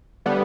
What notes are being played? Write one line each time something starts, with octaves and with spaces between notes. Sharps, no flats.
D3 G3 B3